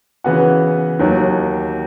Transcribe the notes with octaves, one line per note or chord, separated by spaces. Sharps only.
C#3 E3 B3 F#4
D#2 D#3 F#3